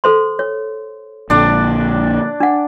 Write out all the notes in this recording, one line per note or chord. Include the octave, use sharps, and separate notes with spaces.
A4 C5 C6
C#5
A#1 A#2 D3 D4 D5
D4 F#5